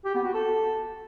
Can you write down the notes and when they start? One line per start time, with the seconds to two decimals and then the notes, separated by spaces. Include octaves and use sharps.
0.05 G4
0.15 B3
0.25 F#4
0.34 A4